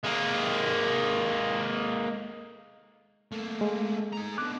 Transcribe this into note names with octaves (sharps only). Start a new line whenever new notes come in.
G#3 A#3
A3 A#3
G#3
G#4 A#5
B2 D3 D6 F#6